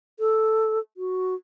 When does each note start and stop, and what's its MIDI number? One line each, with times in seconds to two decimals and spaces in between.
0.20 0.79 69
0.97 1.35 66